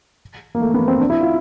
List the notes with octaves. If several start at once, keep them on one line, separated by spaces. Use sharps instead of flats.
A#3
A3
B3
C4
D4
E4
F4